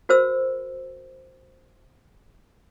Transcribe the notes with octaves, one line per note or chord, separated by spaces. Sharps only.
F#4 A#4 C5 E6